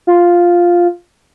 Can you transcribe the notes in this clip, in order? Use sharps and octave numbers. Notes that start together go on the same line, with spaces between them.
F4